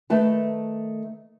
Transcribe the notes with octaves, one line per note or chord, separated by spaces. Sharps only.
D#3 A3 B4 A5